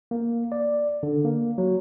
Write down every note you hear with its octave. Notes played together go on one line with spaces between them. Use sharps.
A#3
D5
D3
A#3
F#3